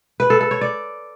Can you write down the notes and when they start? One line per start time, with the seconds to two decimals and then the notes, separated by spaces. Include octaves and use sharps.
0.20 B4
0.30 A4
0.41 A4
0.51 C#5
0.61 D5